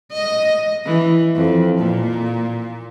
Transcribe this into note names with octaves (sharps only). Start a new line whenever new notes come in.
D#5
E3
F2
A#2